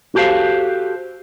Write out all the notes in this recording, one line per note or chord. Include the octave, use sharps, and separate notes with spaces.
F#4 G4 A4 C5 F5